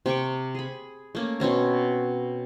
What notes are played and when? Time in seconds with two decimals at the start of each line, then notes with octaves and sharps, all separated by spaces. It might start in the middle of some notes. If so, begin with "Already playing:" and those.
0.06 C3 G5 C#6 D6
0.55 G#4 B5
1.15 A3 A#3 C#4
1.40 B2 C4 C#4 A#5